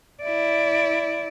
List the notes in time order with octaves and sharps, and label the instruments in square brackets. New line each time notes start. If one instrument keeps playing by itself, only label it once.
[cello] E4 D5